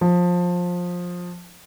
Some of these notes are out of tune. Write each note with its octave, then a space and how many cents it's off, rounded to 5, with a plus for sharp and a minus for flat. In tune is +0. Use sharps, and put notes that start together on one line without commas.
F3 +20